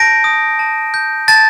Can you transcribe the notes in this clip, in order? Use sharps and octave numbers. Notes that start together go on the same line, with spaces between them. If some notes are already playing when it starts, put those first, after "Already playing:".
Already playing: A5 G6 A#6 D7
D#6
A5
G6
A5 A6